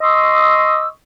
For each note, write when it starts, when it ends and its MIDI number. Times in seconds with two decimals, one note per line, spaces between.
0.01 0.88 75
0.01 0.88 84
0.01 0.88 85
0.01 0.88 87
0.01 0.88 88